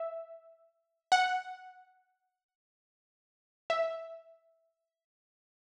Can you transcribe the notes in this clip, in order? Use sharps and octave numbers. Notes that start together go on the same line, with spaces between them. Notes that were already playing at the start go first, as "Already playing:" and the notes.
Already playing: E5
F#5
E5